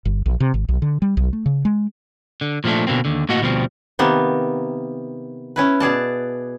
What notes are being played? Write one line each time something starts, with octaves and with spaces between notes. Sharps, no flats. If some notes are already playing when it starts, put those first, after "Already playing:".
G1
A#1
C3
G#1
B1
D3
G3
B1
A3
C#3
G#3
D3
A#2 F3 G3 A3 D4
B2 D3 A#3 C4
D#2 D3
A2 A#3 F#4 D#5 F#5
D2 B2 F3 G3 C4
C3 D#3 A#3 B3
C#4 E4 B4
B2 G#4 D5 A5